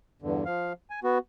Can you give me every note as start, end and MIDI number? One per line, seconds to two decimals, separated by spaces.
0.22 0.44 40
0.22 0.44 43
0.22 0.44 50
0.45 0.73 53
0.45 0.73 77
0.90 1.00 80
1.04 1.18 59
1.04 1.18 66